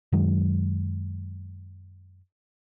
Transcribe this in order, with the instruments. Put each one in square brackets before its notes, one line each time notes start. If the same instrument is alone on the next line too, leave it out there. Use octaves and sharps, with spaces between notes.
[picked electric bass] F#2 D#3 F#3 G#3